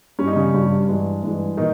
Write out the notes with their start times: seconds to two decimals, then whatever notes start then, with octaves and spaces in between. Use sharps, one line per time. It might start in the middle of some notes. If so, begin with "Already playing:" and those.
0.19 G2 G3 C#4
0.27 D#4
0.36 C#3 C#4
0.54 G2 G3
0.88 G2 E3 G#3
1.23 G2 E3 G#3
1.57 A#2 D#3 D#4